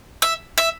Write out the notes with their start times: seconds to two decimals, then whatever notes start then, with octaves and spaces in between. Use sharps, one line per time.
0.22 E5
0.58 E5